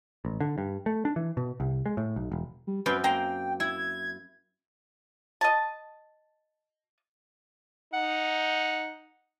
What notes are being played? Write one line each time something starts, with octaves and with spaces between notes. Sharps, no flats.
A1
D3
G2
A3
D4
E3
B2
C2
G#3
A2
B1
E1
G3
F#2 C4 B4 G5
A#3 G5 A#5 C6
E4 G#6
D#5 A5
D#4 F#5